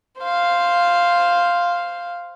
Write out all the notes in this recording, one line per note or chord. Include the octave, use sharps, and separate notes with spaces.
C5 F5